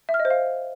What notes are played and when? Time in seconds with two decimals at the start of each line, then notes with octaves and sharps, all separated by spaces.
0.09 E5
0.14 F6
0.20 D#5
0.25 C5
0.30 F5